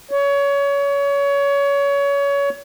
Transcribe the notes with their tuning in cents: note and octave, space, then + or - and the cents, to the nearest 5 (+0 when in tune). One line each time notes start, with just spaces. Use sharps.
C#5 +25